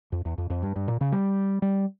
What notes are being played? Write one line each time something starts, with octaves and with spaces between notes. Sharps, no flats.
F2
E2
F2
F2
G2
G2
A#2
C#3
G3
G3